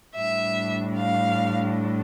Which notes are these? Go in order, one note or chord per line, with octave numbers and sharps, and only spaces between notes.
A2 G3 D4 E5
F5